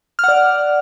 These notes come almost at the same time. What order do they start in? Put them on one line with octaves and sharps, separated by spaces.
F6 F#5 D5